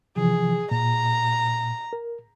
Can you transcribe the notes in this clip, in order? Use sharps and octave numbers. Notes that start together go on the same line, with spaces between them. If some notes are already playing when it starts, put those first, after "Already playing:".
C3 E3 F3 G#4
A#2 A#5
A#4